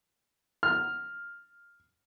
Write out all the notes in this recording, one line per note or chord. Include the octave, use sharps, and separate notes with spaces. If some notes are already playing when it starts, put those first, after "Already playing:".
F6